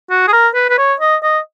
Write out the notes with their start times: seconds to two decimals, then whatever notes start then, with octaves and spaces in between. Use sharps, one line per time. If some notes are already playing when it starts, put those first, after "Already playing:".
0.10 F#4
0.27 G#4
0.32 A#4
0.54 B4
0.69 B4
0.78 C#5
1.00 D#5
1.23 D#5